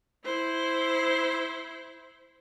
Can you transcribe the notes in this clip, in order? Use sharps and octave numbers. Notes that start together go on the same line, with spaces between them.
E4 C5